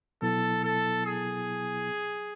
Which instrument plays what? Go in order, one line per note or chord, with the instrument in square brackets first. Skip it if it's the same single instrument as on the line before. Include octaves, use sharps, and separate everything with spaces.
[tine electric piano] B2 F#3 B3 E4 [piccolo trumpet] A4
[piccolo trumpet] A4
G#4